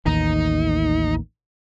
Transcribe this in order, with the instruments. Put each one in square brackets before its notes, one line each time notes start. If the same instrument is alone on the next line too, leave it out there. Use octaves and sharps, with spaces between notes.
[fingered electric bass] A1 D#2 D#3 [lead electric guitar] D#4